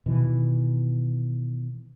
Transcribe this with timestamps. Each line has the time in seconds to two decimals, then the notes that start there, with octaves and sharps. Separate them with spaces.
0.06 B2 D#3 E3